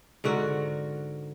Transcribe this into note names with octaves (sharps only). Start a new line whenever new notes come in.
G#2 D3 F#4 A#4